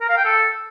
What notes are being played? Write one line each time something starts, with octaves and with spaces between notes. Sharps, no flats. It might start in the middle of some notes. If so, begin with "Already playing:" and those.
A#4
F5
G5
A4